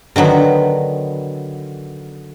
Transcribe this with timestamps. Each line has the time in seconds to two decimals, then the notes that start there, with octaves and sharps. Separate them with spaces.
0.16 D3 D#3 F#3 B3